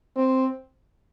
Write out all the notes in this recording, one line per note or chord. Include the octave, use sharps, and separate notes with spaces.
C4